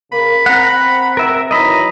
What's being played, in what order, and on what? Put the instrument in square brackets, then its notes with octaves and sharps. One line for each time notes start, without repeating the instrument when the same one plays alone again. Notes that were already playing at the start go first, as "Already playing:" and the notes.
[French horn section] C#3 A#3 [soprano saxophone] B5
[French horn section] C4 [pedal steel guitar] F#5 A#5
[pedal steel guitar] A#4 E5
[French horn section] D#3 E3 F#3 [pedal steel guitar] D#5 B5 [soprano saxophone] A#5